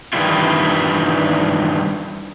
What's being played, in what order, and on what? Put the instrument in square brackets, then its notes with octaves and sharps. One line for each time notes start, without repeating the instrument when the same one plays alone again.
[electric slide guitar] G2 D#3 E3 G3 E4 F4